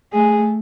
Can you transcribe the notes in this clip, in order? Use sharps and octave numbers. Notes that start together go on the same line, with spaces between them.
A3 G#4